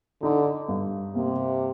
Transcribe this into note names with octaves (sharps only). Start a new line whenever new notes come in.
D3 D#4
G2
C3 A#3